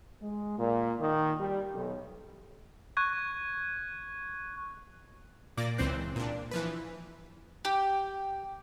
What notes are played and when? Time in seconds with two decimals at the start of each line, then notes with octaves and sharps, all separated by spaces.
0.21 G#3
0.59 A#2
1.00 D#3
1.40 G3
1.75 B1
2.97 C#6 F#6 G#6
5.57 A#2 A#3 D5 D6 A#6
5.78 C#2 E3 C4 C5 F#6
6.16 A#2 D4
6.51 E3 F3 B4
7.65 G4